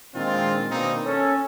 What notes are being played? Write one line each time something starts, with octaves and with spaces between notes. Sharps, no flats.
A#2 D#3 G#3 C4 D4 F4
B2 D#3 A#3 C4 D4 D#4
C#4 A4